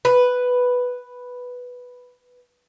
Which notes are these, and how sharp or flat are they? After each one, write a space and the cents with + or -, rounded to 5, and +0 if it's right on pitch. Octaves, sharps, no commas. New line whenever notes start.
B4 +0